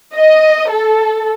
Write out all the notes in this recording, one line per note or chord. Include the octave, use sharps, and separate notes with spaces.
D#5
A4